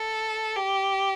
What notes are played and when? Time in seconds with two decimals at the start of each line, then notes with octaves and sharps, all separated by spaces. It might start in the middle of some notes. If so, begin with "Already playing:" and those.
Already playing: A4
0.56 G4